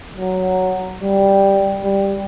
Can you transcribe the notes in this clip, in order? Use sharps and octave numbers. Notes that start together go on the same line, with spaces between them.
F#3
G3
G3